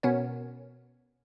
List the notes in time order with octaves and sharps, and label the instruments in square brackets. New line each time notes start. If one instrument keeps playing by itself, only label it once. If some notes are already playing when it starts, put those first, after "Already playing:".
[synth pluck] B2 B3 C#4 A#4 C#5